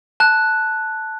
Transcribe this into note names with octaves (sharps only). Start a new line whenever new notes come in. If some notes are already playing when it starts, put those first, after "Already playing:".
A5 F#6